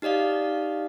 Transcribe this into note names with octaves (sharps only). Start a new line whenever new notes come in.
D#4 G4 D5 D#5 F5